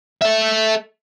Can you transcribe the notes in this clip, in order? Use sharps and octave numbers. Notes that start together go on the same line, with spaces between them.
A4 E5